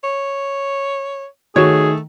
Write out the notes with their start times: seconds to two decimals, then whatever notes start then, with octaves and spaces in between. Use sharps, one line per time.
0.03 C#5
1.56 D#3 A3 F#4 G#4 C#5